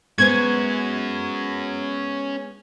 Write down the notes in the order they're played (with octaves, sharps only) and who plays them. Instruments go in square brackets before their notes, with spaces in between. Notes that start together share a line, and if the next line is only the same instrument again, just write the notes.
[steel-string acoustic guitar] G#3 B3 C5 [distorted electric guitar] C#4 F#4 [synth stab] G#6